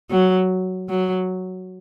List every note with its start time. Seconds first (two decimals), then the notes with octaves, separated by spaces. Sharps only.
0.10 F#3
0.89 F#3